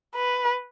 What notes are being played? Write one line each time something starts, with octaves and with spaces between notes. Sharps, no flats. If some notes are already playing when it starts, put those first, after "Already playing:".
B4